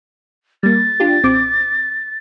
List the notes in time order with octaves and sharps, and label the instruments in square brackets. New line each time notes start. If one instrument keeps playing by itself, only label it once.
[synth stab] G3 A#3 [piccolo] A6
[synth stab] D4 F4 G4
A1 C4 D6